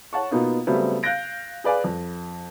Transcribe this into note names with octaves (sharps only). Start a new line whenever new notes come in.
C#5 F#5 A5 C#6
B2 A#3 B3 D#4 F4
C#3 F#3 G3 A3 B3 C4
F5 F#6 G6 A6 A#6 D7
G#4 B4 D5 F5 G#5
F2